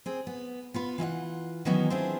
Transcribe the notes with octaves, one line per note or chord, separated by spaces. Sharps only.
C4 G#4
B3
B3 F4 B4
E3 F4 D#5 F#5
D#3 E3 F#3 B3 C#4 D#4
C4 D4 E4 F4 G#4